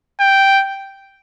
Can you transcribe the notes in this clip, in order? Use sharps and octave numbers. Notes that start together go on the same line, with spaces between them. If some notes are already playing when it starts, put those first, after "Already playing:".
G5